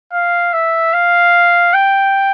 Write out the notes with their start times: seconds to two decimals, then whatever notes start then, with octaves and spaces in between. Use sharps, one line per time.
0.13 F5
0.53 E5
0.93 F5
1.74 G5